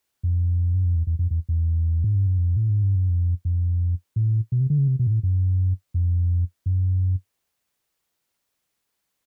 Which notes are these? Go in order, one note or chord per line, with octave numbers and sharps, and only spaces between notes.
F2
F#2
F2
E2
E2
F2
E2
E2
G#2
G2
F#2
F2
A2
G#2
G2
F#2
F2
F2
A2
B2
C3
D3
C#3
C3
B2
G#2
A2
F#2
F2
F#2